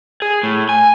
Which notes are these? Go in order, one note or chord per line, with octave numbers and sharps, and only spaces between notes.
G#4
A2
G#5